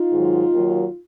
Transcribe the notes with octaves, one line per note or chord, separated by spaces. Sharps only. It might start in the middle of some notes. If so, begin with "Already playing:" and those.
Already playing: D#4 F4
G#2 D#3 F#3
D#2 D#3 F#3